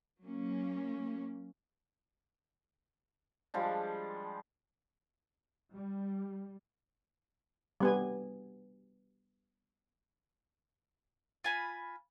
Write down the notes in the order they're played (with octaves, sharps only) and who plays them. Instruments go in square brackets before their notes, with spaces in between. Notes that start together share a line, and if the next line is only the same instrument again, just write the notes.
[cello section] F#3 A#3 C#4
[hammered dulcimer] F3 G3 G#3 D4
[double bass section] G3
[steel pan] G3 B3 G#5
[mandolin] F4 G#5 B5